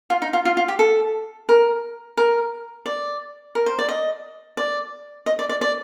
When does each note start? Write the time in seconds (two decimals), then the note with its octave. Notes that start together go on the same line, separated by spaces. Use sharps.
0.10 F4
0.22 D#4
0.33 F4
0.45 F4
0.57 F4
0.68 G4
0.79 A4
1.49 A#4
2.17 A#4
2.86 D5
3.55 A#4
3.66 C5
3.79 D5
3.89 D#5
4.57 D5
5.26 D#5
5.39 D5
5.49 D5
5.61 D5